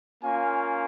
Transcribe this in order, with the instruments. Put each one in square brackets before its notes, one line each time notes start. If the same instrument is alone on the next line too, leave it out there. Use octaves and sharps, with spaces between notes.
[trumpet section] A#3 C#4 F4 F5 G#5